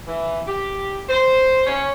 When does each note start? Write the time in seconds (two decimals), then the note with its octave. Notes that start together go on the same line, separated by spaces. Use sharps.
0.07 E3
0.47 G4
1.09 C5
1.66 C#4